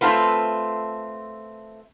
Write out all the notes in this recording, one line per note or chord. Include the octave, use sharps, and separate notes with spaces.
A3 C4 F4 B4